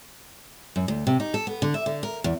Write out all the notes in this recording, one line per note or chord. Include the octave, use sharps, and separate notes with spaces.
F#2
D2
C3
D#4
A4
B3
D3
E5
D3
A#4
E2